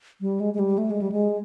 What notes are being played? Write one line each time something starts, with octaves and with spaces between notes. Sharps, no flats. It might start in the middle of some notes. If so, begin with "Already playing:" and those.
G3
G#3
G#3
G3
A3
G#3
G3
G#3